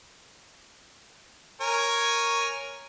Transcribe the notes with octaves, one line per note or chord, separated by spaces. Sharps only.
A#4 C#5 G#5